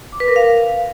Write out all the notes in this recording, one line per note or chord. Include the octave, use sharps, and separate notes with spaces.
D6
B4
A#4
F5